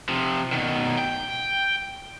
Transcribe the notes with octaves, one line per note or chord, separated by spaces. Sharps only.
C3 F3
B2 D#3
G5